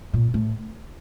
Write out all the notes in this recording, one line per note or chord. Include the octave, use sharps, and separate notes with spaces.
A#2
A2